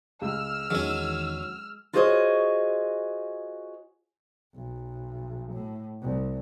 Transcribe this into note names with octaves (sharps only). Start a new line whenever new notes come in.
C#2 E6 F6
E2 D#3 F#3 G#3 C#4
F4 F#4 G#4 C5 C#5 D#5
B1
A2
C2